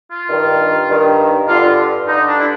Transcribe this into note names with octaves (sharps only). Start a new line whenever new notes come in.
F4
G2 D#3
G2 D#3
G2 D3 F4
G2 D3 D#4
D4
E4